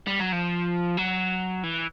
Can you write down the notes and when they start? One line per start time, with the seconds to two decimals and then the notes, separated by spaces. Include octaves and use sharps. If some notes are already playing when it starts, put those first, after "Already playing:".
0.07 G3
0.19 F#3
0.32 F3
0.97 F#3
1.63 E3